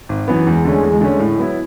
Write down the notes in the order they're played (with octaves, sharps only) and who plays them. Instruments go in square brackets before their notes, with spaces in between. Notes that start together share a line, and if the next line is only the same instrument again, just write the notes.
[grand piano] G#1
F#2 E3 B3
[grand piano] E2 [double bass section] G#3
[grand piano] D3 A3 C#4
E2
D3 A3 C#4
A2
F#3 B3 E4